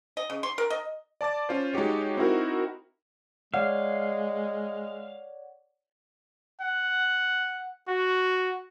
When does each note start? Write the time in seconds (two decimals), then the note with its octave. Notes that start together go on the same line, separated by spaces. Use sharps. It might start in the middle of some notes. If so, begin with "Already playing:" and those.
0.17 D#5
0.30 C#3
0.43 C6
0.58 A#4
0.70 D#5
1.21 D5 A5 D6 A6
1.49 C#4 F4 C5
1.73 G#3 D#4 F#4 G4 C#5
2.17 C4 D#4 E4 F#4 A#4
3.54 G#3 C#5 D5 F5 F#5
6.61 F#5
7.88 F#4